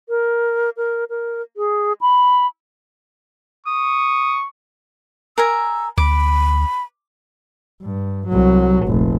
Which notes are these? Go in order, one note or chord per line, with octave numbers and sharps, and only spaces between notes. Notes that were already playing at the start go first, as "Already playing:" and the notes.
A#4
A#4
A#4
G#4
B5
C#6 D#6
A#4 G#5 A#5 E6
D2 B5 D6
G2
C2 F#3
F1 A#1